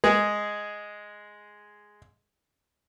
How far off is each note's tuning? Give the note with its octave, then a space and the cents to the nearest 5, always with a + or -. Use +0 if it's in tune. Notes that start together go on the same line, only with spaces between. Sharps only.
G#3 +0 G#4 +0